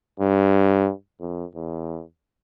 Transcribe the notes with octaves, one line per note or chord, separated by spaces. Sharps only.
G2
F2
E2